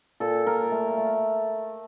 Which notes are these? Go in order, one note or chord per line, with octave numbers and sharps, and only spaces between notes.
A#2 A4
A#2 A#4
A3
A3